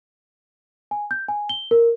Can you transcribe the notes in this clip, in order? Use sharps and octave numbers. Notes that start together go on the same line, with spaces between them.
G#5
G6
G#5
G7
A#4